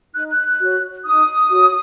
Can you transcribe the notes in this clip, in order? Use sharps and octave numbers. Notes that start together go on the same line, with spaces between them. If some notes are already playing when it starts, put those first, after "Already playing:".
D#4 F#6
F#6
F#4 C#5
D#4 D#6
F#4 C#5